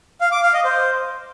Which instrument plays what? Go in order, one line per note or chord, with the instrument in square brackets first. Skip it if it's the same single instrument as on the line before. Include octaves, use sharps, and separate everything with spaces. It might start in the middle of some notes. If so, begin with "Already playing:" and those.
[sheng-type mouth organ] F5
D6
F5
D#5
C5